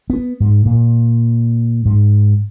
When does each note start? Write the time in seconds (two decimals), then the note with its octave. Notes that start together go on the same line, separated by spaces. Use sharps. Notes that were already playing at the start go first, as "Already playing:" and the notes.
0.10 B3
0.40 G#2
0.65 A#2
1.85 G#2